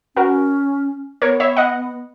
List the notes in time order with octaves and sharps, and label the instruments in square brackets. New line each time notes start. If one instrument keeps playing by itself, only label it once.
[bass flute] C#4 [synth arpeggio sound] F#4 A#4
[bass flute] B3 [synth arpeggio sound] A#4 C#5
[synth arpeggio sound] C#5 E5
D#5 F#5